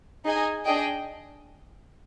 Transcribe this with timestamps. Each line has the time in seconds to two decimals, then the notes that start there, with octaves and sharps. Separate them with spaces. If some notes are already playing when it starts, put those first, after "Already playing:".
0.25 D#4 G#4 D#5 G#5
0.65 D4 G#4 D#5 G5